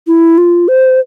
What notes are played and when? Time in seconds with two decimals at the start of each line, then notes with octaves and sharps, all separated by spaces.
0.07 E4
0.38 F4
0.68 C5